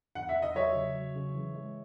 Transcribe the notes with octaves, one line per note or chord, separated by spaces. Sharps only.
E2 F#5
E5
C#4
D#5
F#3 C#5 E5
C#3
F#3
C#3
E3
G#3